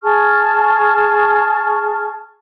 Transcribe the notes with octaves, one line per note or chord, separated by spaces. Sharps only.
G#4 A5 C#6 F6